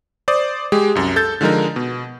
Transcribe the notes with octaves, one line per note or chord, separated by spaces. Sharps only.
C5 D5 D#6
G#3 G4 G#4
C2 F#2
A4 G6 A6
D3 F3 G#3 D#4 A#4
B2